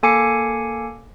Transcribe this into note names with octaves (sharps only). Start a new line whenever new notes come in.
A#3 A4 G#5 D6 C7 C#7